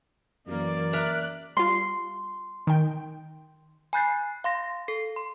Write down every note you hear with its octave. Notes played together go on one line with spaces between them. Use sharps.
F#2 E3 A#3 D5
A#4 E5 A#5 F#6
G3 F4 C6
D#3 G5
G#5 B5 F#6 G6 A6 C7
F5 C6 A#6
A4 C7
C6